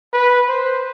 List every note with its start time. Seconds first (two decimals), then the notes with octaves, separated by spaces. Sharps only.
0.13 B4
0.48 C5